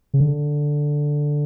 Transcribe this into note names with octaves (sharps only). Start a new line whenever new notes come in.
C#3
D3